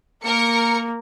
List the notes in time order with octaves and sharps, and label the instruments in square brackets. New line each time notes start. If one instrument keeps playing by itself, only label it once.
[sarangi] A#3 [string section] A#4 C#7